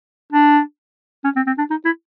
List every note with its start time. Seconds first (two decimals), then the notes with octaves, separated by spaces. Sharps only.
0.33 D4
1.24 C#4
1.36 C4
1.47 C4
1.58 D4
1.71 D#4
1.85 E4